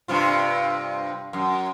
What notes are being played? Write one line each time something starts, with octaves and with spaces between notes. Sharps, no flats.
G2 C3 F4
F#2